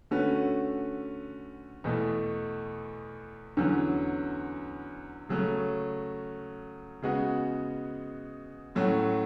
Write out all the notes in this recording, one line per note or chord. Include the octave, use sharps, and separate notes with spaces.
D3 A3 C#4 F#4 B4
E2 B2 A3
E2 D3 F#3 C#4
C#3 F#3 A3 C#4
C#3 G#3 B3 F#4
A2 F#3 A3 C#4 F#4